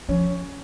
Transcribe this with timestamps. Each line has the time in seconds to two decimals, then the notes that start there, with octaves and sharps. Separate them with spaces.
0.09 F3 C#4